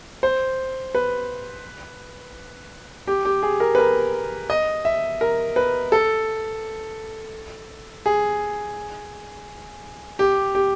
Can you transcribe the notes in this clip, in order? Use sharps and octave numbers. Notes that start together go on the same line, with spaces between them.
C5
B4
G4
G4
G#4
A#4
B4
A#4
D#5
E5
A#4
B4
A4
G#4
G4
G4